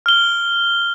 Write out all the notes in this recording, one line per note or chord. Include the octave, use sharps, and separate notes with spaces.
F6 G7